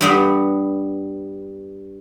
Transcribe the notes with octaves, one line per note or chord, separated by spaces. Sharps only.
G2 G3 B3